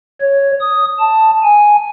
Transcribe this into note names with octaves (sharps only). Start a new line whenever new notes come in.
C#5
D#6
A5
G#5